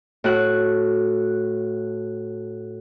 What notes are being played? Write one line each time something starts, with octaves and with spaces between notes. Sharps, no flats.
A2 F#4 F#6